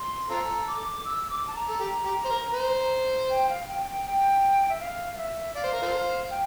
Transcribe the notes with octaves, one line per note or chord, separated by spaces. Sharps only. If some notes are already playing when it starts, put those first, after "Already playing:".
Already playing: C6
C4 F4 A4 A#5
D6
E6
D6
A5
A#5
A4
G4
G4
C5
A#4
C5
G5
F5
G5
G5
G5
E5
F5
F5
E5
D5 F5
C5
A#4
F4 A4 C5
G5